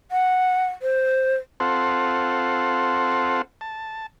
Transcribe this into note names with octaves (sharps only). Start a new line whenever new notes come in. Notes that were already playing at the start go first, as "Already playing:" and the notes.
F#5
C5
C4 F4 A4 C5 F#5
A5